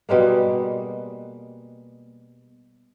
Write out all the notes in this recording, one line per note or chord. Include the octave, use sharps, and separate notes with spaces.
B2 G3 G#3 A#3